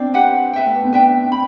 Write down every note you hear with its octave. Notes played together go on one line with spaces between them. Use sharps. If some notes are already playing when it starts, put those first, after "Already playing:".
Already playing: C4 D4
G4 B4 F#5
B4 E5 G5
A3
B3
C4
D4 B4 E5 G5
D4
C4 B5